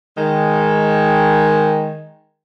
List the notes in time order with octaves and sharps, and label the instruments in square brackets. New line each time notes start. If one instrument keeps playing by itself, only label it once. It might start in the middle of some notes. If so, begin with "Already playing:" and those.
[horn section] D#3 G#3